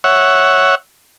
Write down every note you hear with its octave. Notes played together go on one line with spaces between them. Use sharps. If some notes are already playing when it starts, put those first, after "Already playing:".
C#5 E5 F#5